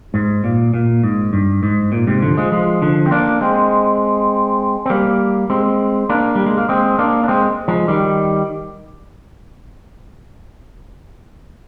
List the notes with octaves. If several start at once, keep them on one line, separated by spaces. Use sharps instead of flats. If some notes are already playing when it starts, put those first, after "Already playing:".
G#2
A#2
A#2
G#2
G2
G#2
A#2
G#2 C3
D3 F3
F3 G#3
F3 G#3
D3 F3
C4
A#3 D4
G#3 C4
C4
G3 A#3
G#3 C4
A#3 D4
G3
G#3
A#3
G#3 C4
A#3 D4
D4
G#3 C4
F3 G#3
D#3 G3